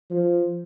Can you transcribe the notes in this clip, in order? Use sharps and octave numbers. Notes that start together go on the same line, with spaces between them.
F3